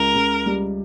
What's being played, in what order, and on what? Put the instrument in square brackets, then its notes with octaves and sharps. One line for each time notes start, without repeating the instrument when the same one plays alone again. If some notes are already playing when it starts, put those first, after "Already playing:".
Already playing: [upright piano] C#2 [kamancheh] A#4
[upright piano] C#2
G3